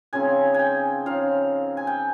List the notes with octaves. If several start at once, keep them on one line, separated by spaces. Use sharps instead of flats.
C#3 F3 C4 D#4 G#5
G5 G#5
C#3 F3 C4 D#4 F5
G#5
G5